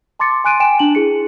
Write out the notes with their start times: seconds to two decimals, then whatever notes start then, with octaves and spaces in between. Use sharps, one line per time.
0.19 A5 C6 D6 A6 C#7
0.44 G#5 C6 F#6 D7 D#7
0.60 G5 G#5 D7 E7
0.79 D4 A5 F#7
0.95 E4 G#4 C#7